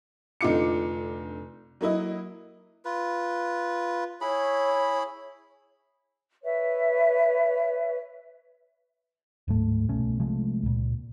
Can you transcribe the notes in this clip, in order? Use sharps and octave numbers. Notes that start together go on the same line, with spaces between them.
F1 D3 D#4 F4 D6 C#7
F#3 A#3 E4 D#5
F4 B4
E4 G#4 C#5 B5
B4 C#5 E5
D1 G#2 A3
C2 B2 A3 C#4
C3 F3 G#3 A3
C#2 A#2